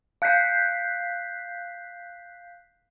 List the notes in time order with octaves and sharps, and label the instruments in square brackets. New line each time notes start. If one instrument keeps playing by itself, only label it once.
[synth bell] F5 F#6 G6 B6 C7